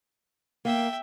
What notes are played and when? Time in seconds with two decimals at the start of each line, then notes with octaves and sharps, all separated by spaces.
0.65 A#3 E5 G5